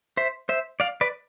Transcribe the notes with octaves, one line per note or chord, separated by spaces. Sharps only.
C5 E5
C5 E5
D5 F5
B4 D5